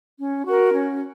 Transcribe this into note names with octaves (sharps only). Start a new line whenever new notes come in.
C#4
F#4 A#4
C#4